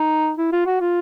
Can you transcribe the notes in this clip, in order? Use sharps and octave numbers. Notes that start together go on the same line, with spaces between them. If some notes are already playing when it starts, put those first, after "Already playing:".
Already playing: D#4
E4
F4
F#4
F4